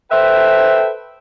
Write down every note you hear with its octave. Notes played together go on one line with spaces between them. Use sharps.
A4 B4 C5 E5 G5